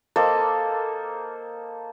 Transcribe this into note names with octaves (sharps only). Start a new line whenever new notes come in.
A#3 A4 C5 D#5